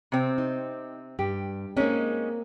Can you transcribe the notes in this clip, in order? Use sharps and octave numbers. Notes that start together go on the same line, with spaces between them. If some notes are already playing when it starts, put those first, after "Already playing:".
C3 C4
D#4
G2 G4
G#3 A#3 C4 C#4 D#4